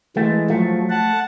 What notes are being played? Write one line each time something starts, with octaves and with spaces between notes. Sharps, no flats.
E3 G#3 A3
F3 F#3 A3
F#5 A5